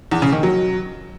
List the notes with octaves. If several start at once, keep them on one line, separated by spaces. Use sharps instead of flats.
E2
C#3
D#3
F#3